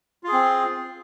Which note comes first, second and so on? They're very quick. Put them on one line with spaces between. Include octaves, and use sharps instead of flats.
F4 G#4 C4